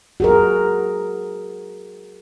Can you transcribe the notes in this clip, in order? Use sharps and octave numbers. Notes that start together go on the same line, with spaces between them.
F#4 G#4 A#4